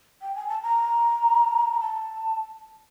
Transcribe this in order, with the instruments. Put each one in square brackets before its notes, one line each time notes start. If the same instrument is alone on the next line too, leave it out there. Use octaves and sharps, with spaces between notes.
[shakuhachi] G5
G#5
A5
A#5
A5